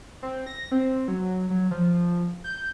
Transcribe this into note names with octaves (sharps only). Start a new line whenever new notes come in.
C4
A#6
C4
F#3
F#3
F3
G6